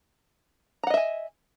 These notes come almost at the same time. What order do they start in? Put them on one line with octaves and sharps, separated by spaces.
A#5 F#5 D#5 E5 G#5